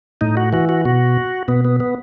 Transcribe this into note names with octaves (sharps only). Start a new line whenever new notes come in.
A2 D#4
F#4
E3 F#4
F#4
B2 F#4
B2 B3
B3
B3